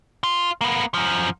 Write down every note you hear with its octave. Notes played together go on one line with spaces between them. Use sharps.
F4
A#3 B3
F#2 F3